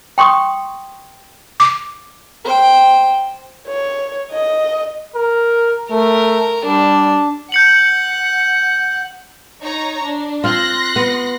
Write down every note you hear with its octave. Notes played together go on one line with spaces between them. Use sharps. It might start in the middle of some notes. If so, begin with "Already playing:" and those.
G5 C6 C#6 D#6
D6
C5 G5
C#5
D#5
A#4
A3 A#4
G3 D4
F#5 G6 C#7 F#7
D#4 C#5 A#5
D4
C4 F4 C6 F#6 A#6
B3